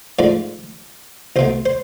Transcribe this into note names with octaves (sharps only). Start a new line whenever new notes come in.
G#2 F3 A3 D5
C2 B2 A3 C5
C5